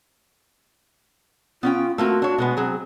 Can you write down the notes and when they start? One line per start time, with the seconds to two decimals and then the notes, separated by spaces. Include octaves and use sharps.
1.63 B3 C#4 F4 G5
1.98 A3 A#3 C4 F#4
2.22 D4 C#5
2.38 B2 G#3 B3
2.57 F#3 C4 G#4